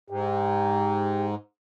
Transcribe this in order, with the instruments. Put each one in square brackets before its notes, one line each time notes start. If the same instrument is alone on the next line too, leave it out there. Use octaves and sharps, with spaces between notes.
[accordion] G#2 [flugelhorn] G4